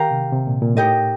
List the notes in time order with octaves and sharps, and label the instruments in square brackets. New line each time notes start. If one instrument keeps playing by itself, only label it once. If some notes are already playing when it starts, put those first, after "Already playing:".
Already playing: [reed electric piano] D#3 [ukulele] G4 A#4 F5 A#5
[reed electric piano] C3
C3
A#2
A#2
[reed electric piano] A2 [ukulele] D#4 G4 A#4 D#5